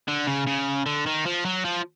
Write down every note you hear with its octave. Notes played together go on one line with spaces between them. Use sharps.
D3
C#3
C#3
D3
D#3
F3
F#3
F3